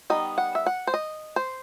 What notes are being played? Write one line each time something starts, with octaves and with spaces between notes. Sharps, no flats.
D#3 G3 B3 D#4 D#5
F#5
E5
F#5
C5
D#5
C5